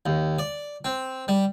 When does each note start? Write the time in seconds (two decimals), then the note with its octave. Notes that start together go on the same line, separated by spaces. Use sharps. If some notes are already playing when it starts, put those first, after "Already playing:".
0.06 D#2
0.39 D5
0.85 C4
1.28 G3